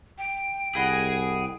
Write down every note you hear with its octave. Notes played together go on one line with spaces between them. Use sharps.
G5
C2 G#4 D#5 F#5 B5